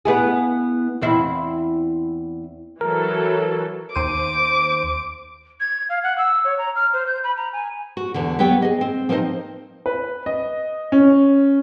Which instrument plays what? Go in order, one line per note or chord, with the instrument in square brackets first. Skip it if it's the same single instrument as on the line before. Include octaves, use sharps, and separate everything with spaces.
[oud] B3 E4 G#4
E2 C4 E4
[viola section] E3 F#3 A4 [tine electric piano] A#4
[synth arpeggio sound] D#2 C5 D#7 [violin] D6
[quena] G#6
F5
F#5
E6
C#5
A#5
F6
C5
G6
B5
A#5
G#5
[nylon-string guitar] F#4
E2 D3
F#3 B3 G4 C#5 G5
G#4 D#5
C4
F3 C4 D#4 A#4 C5 D#5
[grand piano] B4
D#5
C#4